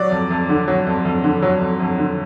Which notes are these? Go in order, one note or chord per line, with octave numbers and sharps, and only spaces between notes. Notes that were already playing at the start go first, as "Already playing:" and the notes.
Already playing: F#3 D5
F2
F2
D3
F#3
F2
F2
D3
F#3
F2
F2
D3